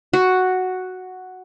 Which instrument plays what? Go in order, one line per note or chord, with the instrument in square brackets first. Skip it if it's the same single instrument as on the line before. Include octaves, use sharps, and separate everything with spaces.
[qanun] F#4